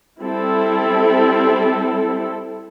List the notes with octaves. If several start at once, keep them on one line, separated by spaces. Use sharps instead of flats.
G3 C4 E4 A4